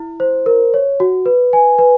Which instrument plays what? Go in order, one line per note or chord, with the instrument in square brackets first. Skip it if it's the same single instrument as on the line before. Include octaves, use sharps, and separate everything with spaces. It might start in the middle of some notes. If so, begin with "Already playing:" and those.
Already playing: [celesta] E4
C5
A#4
C#5
F#4
B4
G#5
B4